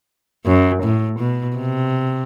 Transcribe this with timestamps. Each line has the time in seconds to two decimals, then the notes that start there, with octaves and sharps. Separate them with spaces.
0.46 F#2
0.83 A2
1.19 B2
1.57 C3